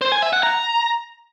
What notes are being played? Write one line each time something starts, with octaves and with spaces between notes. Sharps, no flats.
C5
G#5
E5
F#5
A#5